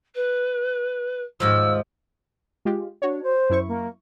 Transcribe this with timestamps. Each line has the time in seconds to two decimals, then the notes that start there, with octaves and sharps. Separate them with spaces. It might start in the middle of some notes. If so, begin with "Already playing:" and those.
0.15 B4
1.40 D#2 G#2 F3 E6
2.65 G#3 F4 G4
3.02 D4 F#4 C#5
3.23 C5
3.50 F#2 E4 C#6
3.68 A#3